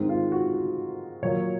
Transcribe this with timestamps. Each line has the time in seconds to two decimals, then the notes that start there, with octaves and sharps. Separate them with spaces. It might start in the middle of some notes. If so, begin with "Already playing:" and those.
Already playing: G#2 D#3 G#3 C4
0.09 F4
0.32 F#4
0.54 F#4
1.22 A#2 F#3 A#3 C#5